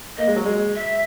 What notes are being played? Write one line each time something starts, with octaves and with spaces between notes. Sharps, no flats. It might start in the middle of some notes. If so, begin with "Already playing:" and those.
A#3 D#5
G#3
F#3
G#3
E5